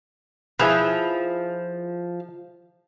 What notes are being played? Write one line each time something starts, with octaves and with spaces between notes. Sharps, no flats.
F3 E4 G#4 B4